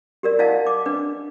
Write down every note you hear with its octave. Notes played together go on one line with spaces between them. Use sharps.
G4 A#4 D5
E4 D5 D#5 F5 F#5 A5
D6
D4 B4